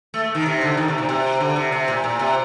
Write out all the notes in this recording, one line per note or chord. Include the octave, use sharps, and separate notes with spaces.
A3
A3
D#3
C3
D3
D#3
C3
A#2
C3
D3
C3
C3
A#2
A#2
C3